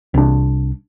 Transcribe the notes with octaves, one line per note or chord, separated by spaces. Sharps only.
C2 D4